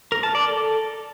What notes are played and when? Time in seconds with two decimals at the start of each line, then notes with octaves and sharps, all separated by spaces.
0.12 A#4
0.23 A5
0.35 D5
0.46 A4